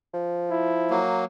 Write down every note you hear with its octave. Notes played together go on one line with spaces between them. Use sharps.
F3
E4
F#3 A#3